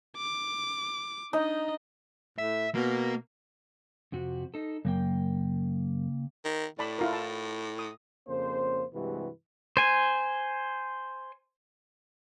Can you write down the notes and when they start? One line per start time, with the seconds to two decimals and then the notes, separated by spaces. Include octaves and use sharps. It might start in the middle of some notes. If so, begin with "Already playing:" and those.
0.17 D6
1.33 D4 D#4 D#5
2.38 A2 E5
2.75 B2 A#3
4.12 F2 C3 F#4
4.54 D#4 A4
4.85 F#2 C#3 A#3 G5
6.45 D#3
6.79 A2 D5 A5 B5
6.99 E4 F4 A#4
7.13 A5
7.79 D#6
8.28 F2 C#3 A#3 C#4 C5
8.93 G2 C3 E3 G#3 F#4 B4
9.77 C5 G#5